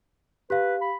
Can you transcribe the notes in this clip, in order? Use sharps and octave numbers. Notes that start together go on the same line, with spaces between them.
G4 B4 F5
B5